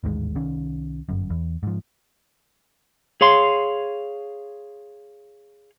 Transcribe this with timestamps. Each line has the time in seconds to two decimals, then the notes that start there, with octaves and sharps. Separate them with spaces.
0.04 A1 D#2 G#2 G#3
0.35 C2 D#3 C#4
1.09 G1 F#2
1.30 E2
1.63 G#2 F3
3.21 G#4 C#5 F5 C6